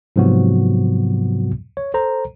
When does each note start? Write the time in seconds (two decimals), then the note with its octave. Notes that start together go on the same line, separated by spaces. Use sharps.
0.16 G#2 C3 F3 F#3 B3 F#4
1.77 C#5
1.94 A4 C5 A#5